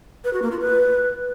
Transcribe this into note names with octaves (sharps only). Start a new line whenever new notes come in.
B4
F#4
A#3
F4
B4